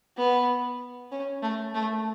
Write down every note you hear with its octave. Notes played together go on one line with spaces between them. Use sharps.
B3
C#4
A3
A3